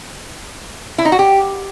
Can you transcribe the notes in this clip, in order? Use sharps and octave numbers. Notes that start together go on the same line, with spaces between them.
E4
D#4
F#4
G4